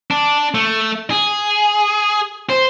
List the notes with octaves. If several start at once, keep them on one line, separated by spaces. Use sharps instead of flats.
D4
A3
G#4
C5